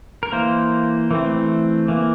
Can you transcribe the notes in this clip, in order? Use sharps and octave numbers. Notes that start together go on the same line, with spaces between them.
A#4
E3 A#3 C5
E3 A3 C4
E3 A#3